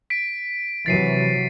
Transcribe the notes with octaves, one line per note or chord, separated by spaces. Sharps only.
B6 D7
C3 E3 F#3 A6 C7 D#7